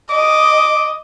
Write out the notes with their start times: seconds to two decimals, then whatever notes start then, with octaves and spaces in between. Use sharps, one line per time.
0.10 D#5 D6